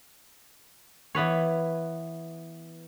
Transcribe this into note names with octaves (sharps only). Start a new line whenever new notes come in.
E3 B3 B4 C#5